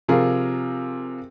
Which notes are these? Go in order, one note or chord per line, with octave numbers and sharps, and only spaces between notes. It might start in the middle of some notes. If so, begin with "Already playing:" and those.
C3 F3 F4 G#4 A#4